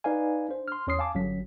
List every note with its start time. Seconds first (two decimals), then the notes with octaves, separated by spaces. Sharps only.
0.04 D#4 B4 D5 F5 G#5
0.49 D4 C5
0.68 C6 F6
0.87 E2 C#4 C#5 C6 D#6 C7
0.99 F5 G#5 A5 D6
1.15 G1 F#3 C#4 B6